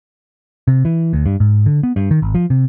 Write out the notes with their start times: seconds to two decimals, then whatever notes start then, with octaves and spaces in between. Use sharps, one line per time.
0.68 C3
0.85 E3
1.13 D2
1.26 G2
1.40 G#2
1.66 D3
1.83 B3
1.96 G2
2.11 D#3
2.22 G#1
2.35 F3
2.50 C3